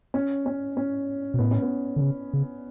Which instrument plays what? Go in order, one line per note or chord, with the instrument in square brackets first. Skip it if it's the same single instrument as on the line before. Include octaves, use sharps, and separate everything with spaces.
[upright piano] C#4
C#4
C#4
[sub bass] B2
[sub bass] A2 [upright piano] B3
[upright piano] C#4
B3
[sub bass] D3
C#3
C#3